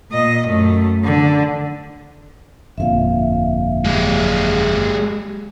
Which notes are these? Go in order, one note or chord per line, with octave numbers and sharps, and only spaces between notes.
A#2 D#5
F#2 A3
D3
G1 F2 A#2 E5 F5
G#3 G4